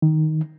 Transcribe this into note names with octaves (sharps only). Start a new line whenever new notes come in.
D#3